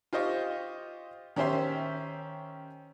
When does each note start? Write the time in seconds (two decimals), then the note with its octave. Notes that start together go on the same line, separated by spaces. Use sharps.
0.13 F4 G4 C5 D#5 C#6
1.36 D#3 C#4 G4 C5 E5 C6